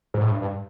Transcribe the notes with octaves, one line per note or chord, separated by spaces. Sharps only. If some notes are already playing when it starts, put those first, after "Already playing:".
G#2
A2
G2
G2